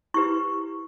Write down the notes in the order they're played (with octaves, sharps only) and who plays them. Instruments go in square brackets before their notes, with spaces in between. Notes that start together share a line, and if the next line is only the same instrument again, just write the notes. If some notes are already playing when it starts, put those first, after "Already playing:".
[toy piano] E4 G4 B4 C#6